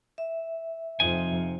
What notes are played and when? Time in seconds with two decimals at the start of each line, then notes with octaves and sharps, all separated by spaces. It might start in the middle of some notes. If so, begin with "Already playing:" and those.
0.18 E5
1.00 F2 C3 F3 D#4 G#5